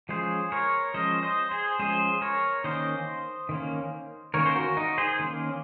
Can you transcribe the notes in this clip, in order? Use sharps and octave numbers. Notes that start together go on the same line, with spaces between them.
F3 G#3 C#4 G#4 C5
A#4 C#5
F3 G#3 C#4 C5 D#5
C5 D#5
G#4 C5
F3 G#3 C#4 G#4 C5
A#4 C#5
D#3 A#3 C#4 C5 D#5
D#3 A#3 C#4
D#3 A#3 C#4 A#4 C#5
C5
F#4 A#4
D#4
G#4 C5
D#3 A#3 C#4